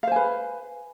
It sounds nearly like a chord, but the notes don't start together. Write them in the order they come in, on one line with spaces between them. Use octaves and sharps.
F5 C5 G#5 B4